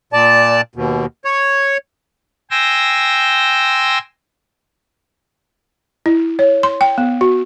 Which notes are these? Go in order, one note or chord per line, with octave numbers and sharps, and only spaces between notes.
A#2 D5 A5
D#2 B2
C#5
G5 G#5 C6 E6 A#6
E4
C#5
C6
G5
B3
F#4